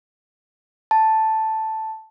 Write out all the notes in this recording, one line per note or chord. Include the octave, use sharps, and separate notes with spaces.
A5